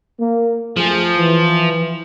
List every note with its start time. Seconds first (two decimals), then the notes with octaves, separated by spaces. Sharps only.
0.19 A#3
0.77 F#2 F3 A3 G#4
1.17 E3